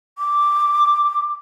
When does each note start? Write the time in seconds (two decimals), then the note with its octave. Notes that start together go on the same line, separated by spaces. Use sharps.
0.18 D6